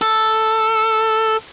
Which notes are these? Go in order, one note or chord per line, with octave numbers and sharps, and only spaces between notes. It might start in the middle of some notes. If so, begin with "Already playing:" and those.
A4